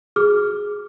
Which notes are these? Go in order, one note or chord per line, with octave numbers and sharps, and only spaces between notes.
F#4 G#4 D6 F6